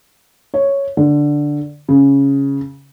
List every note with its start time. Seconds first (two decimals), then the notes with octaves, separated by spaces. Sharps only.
0.54 C#5
0.97 D3
1.89 C#3